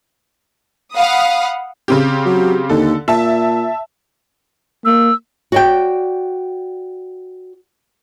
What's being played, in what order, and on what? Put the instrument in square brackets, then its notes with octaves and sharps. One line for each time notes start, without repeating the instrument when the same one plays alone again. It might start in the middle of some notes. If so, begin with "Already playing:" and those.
[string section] F5 F#5 B5 D#6
[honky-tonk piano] C#3 C4 G4
[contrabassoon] F#3
[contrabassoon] D#2 [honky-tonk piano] D3 A4
[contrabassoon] A#2 [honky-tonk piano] E5 A5
[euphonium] A#3 [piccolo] E6
[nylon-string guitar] F#4 D5 G5